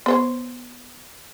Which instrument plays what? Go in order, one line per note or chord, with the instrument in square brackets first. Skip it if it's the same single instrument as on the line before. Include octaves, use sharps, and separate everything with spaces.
[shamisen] B3 C5 C#5